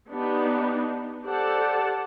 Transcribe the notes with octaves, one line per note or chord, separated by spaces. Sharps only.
B3 D4 D#4 G4
G4 A4 C5 D5 F#5 A5